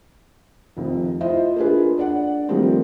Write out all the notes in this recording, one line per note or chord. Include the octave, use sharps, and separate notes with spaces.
F1 F2 D#3
E4 F4 C5 D#5 E5
A#3 D4 F4 G#4 B4
D4 D5 F#5
D#3 F3 G3 A3 A#3 C4